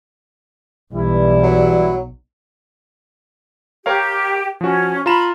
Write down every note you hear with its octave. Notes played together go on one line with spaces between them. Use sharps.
B1 E3 G3 E4
F#3
G4 A#4 C#5 F5
F3 C#4 F#4
F4 A#5 B5 E7